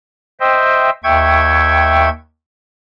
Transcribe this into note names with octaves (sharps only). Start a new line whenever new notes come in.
C5 D#5 E5 G5
D#2 E5 G5 C#6 G#6